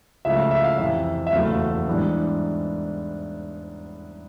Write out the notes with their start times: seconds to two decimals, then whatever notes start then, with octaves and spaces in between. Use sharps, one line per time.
0.25 C#2 C#3 F3 A3 E5
0.38 F5
0.51 E5
0.64 F5
0.78 F2 C3 E3 E5
1.27 E5
1.32 F#1 E2 B2 F#3 A3 F5
1.88 G#2 E3 G3 B3 D4